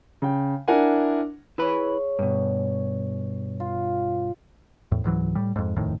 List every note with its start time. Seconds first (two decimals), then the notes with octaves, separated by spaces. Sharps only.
0.22 C#3 G5
0.68 D4 E4 A#4 F#5 G#5
1.58 E4 G#4 B4 C#5 B5
2.19 G2 B2
3.60 F4
4.92 E2 A2
5.04 C#2 G#2 E3 F#3
5.35 A2 G3
5.56 F2 G#2
5.76 D#1 F2 A2 D#3